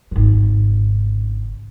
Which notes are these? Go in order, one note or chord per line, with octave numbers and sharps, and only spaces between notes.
G#1 C#3